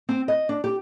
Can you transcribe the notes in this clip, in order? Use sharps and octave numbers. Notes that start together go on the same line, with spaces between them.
C4
D#5
D4
G4